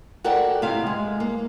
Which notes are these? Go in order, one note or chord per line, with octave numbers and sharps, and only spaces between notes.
F#4 A4 A#4 D5 F#5 G5
C3 E4 F5
G#3
A#3